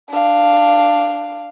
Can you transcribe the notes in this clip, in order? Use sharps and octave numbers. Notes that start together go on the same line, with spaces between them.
D4 F5